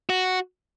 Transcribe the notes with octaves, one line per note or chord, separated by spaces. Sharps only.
F#4